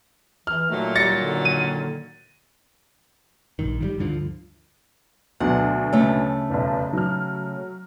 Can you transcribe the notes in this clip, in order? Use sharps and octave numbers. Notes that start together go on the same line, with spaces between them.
E3 F6
A#2 D#3 F#3 A3
G3 A6 A#6 C#7
D3
D#7
A#1 G2 D#3
D#3 F3 G3
D2 G2 D3 F3
D2 B2 F#3 F#5
C#3 A3
F1 B1 E2
F#3 F6